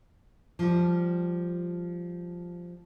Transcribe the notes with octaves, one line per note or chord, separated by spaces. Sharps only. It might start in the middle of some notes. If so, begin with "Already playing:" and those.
F3 G3